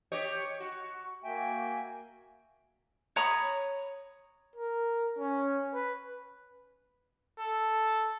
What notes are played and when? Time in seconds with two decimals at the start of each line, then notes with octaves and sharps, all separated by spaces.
0.12 G4 C#5 D#5
0.60 F#4
1.24 A#3 F#4 E5 G5 G#5
3.16 C#5 A#5 B5 D#6
4.55 A#4
5.18 C#4
5.74 B4
7.40 A4